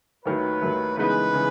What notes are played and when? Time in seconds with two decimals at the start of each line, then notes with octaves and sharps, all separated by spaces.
0.25 D#2 D#3 F#3 A3 B4
0.62 D#2 D#3 F#3 A3
0.97 C#3 E3 G#3 B3 D#4 B4
1.33 C#3 E3